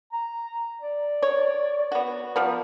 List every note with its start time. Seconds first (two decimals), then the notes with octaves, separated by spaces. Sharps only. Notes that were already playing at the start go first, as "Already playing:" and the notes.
0.12 A#5
0.81 D5
1.22 C#5
1.92 B3 F#4
2.36 F3 G3 B3 A#4